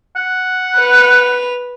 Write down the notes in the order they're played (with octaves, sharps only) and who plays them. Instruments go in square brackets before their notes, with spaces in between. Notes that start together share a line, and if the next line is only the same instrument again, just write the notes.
[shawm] F#5
[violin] B4 F7